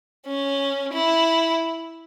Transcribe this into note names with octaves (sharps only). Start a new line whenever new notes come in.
C#4
E4